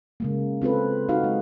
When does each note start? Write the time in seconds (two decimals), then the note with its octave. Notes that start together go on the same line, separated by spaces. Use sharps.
0.20 C#3 G#3 A#3
0.62 C4 F4 A4 B4
1.09 D#4 F#4 F5
1.24 G#3